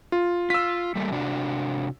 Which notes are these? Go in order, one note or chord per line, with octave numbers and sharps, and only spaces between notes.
F4
F4 E6 B6
G3 A3 A#3
C3 D4 F#4